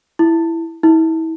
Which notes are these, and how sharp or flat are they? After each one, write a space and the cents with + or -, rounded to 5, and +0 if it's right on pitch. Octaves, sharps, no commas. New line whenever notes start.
E4 +5
E4 -35